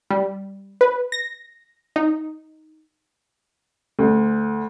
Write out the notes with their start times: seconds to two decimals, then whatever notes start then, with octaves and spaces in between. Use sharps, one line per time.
0.10 G3
0.81 B4
1.12 A#6
1.96 D#4
3.99 D2